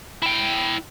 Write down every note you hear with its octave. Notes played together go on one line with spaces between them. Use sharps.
E4 G5